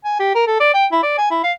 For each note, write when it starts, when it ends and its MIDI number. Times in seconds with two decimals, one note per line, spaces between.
0.05 0.18 80
0.20 0.35 67
0.35 0.45 70
0.47 0.57 69
0.60 0.70 74
0.74 0.86 79
0.92 0.99 64
1.03 1.16 74
1.18 1.30 80
1.31 1.42 64
1.44 1.52 77